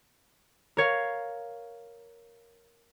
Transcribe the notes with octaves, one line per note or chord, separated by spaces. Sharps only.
A#4 C#5 F5